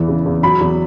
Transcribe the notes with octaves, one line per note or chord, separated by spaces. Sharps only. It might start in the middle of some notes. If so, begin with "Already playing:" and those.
Already playing: E2 E3
C#3
E2
F#3 B5
E2